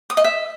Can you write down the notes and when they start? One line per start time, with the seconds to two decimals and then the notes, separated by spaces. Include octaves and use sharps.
0.10 D#6
0.17 D#5
0.24 E5